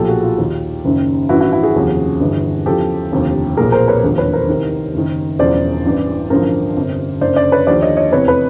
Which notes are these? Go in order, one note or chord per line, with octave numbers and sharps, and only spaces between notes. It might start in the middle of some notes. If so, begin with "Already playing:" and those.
Already playing: B1 A#2 F3 G4 A4
F#4 G#4
F4 G4
D#2 D#3
F#1 F#2 D#3
A1 G2 E3 E4 F#4
E4 F#4
E4 F#4
F#4 G#4
F1 D#2 C#3 F3
G1 G2 E3
E2 C#3 F3 G4 A4
F1 D#2 D3 F3
B1 A#2 F3 G#4 A#4
A#4 C5
B4 C#5
E1 D#2 D3 F3
B4 C#5
A#4 C5
C2 C3 D#3
F#1 F#2 D#3
E1 E2 C#3 F3 C5 D5
A1 G2 E3
A1 G2 D3 F3 A#4 C5
G1 F2 C3
F#1 F#2 D3 C5 D5
C5 D5
B4 C#5
D#2 D3 F3 C5 D5
C#5 D#5
C#5 D#5
F1 E2 C3 B4 C#5
B4 C#5